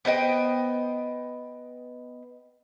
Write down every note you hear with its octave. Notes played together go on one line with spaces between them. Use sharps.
B3 C5 D#5 G5